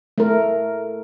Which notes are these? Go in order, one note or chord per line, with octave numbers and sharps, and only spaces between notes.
A3 A#4